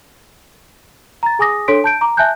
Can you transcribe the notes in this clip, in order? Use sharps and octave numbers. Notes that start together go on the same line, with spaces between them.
A#5 A6
G#4 G#5 D6 D#6 A#6
D4 A4 C#5 C6 B6 D7
A5 G6 D7
A#5 D6
E5 G#5 A5 F#6 G6